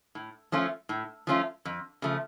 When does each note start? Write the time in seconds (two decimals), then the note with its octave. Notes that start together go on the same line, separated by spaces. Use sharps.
0.15 A2
0.52 F3 A3 C#4 F4
0.89 A2
1.27 F3 A3 C#4 F4
1.65 F2
2.02 C#3 F3 A3